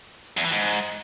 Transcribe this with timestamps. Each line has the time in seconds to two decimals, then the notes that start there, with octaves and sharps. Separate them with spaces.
0.37 E2
0.45 E3
0.52 G#2